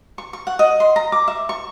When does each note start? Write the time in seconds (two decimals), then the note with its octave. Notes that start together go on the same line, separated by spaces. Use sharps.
0.18 C#6
0.33 C#6
0.47 F#5
0.59 D#5
0.80 C6
0.96 A#5
1.12 D6
1.28 E5
1.49 C#6